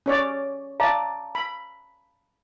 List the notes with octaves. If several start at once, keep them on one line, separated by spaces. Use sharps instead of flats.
C#4 C#5 D5
D5 F5 A5 A#5
B5